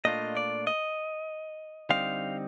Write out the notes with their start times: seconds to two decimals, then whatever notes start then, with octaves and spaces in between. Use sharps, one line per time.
0.05 A#2 A3 D4 F4 D#5
0.37 D5
0.67 D#5
1.89 D3 G3 C4 D#4 F5